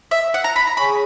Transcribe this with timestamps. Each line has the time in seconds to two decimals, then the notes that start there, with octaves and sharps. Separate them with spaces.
0.11 E5
0.34 F#5
0.44 A#5
0.56 B5
0.67 A#5
0.77 G#4 C#5 G#5 B5 C#6